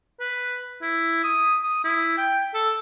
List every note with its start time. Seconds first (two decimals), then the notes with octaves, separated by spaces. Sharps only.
0.20 B4
0.82 E4
1.24 D#6
1.63 D#6
1.84 E4
2.17 G5
2.54 A4